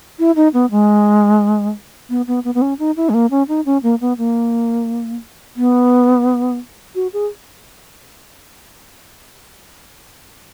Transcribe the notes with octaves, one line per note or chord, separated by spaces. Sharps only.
E4
D#4
B3
G#3
B3
B3
B3
B3
C#4
D#4
E4
G#3
A#3
C#4
D#4
C#4
A#3
B3
A#3
B3
F#4
G#4